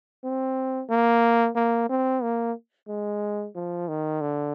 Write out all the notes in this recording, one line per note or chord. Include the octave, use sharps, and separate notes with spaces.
C4
A#3
A#3
C4
A#3
G#3
F3
D#3
D3